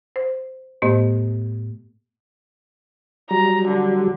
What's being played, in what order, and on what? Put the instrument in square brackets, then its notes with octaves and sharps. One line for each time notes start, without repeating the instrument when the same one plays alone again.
[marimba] C5
A2 A3 B3 G4 C5 D#5
[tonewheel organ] F#3 G3 [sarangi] A#5
[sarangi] D3